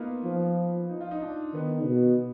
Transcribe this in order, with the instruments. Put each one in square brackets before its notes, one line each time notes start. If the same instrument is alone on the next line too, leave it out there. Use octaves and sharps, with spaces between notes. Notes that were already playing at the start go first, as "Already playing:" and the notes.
Already playing: [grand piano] A#3 B3 D#4 F4
[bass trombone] F3
[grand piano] D#4
F4
D#4
D4
[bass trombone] D#3 [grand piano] B3
[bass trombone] B2